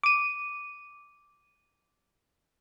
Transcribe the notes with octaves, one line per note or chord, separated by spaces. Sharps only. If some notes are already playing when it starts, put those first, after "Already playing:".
D6 D#7